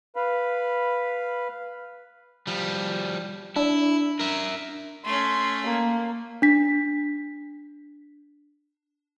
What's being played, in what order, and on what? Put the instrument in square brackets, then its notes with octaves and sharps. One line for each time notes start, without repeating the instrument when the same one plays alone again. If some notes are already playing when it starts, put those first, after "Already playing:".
[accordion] B4 F5 B5
[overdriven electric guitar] F3 G3
[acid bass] D4 [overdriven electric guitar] E4
[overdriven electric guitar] A#4 E5
[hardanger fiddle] A3 C#4 [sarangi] C6
[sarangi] A#3
[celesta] D4 B6